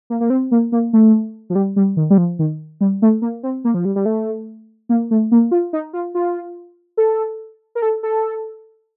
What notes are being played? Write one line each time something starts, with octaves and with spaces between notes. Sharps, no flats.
A#3
A#3
C4
A#3
A#3
A3
F3
G3
G3
D#3
G3
F3
D#3
G3
A3
A#3
C4
A#3
F3
G3
G3
A3
A#3
A3
A#3
F4
D#4
F4
F4
A4
A#4
A4
A4